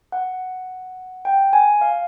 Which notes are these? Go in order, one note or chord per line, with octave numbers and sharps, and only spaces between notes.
F#5
G5
G#5
F5